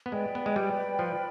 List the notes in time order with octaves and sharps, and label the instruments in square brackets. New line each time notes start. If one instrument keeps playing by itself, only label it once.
[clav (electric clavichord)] B3
[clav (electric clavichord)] G#3 [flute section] B4 D5 G5 B5
[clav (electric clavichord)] B3
G#3
G3
F3